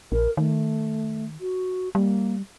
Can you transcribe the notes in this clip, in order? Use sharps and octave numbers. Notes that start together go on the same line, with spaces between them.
A#1 A#4
D#3 A3
F#4
G3 A#3